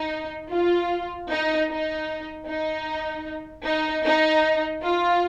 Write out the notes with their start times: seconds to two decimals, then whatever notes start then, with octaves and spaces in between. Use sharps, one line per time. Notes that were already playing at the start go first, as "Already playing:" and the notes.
Already playing: D#4
0.52 F4
1.30 D#4
1.70 D#4
2.47 D#4
3.65 D#4
4.05 D#4
4.83 F4